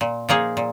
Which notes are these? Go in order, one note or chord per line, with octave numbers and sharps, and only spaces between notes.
A#2
F3 A#3 D#4 G#4
A#2